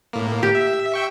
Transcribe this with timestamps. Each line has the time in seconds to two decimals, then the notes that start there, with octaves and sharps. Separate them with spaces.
0.13 A2 A#3
0.43 G4
0.55 E5
0.94 E5 G5 C#6